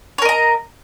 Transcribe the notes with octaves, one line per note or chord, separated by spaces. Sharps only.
A#4 C#5 D#5 A#5